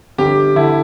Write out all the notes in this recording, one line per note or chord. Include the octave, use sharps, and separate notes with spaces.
G1 G4
D3 E4